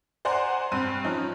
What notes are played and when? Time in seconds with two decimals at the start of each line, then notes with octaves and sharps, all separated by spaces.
0.25 C5 D5 F#5 G#5 A#5 C6
0.72 G2 C4 F#6 D#7
1.04 F3 C#4 D#4